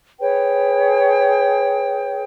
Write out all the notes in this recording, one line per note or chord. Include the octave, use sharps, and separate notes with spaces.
G#4 B4 C#5 G5